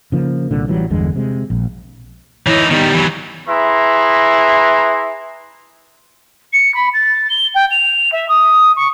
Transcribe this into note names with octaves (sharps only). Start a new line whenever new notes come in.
C#3 F3 A#3
C2 A#2 D3
A1 E3 F#3 G3
G1 E2 D3 G#3
C3 G#3
A#1
E3 D#4 E4 C#5
D#3 G3 B3 D#4 G4
E3 F#3
E4 G#4 B4 A#5 C6
C#7
B5
A6
G7
G5
F7
E5
D#6
C#6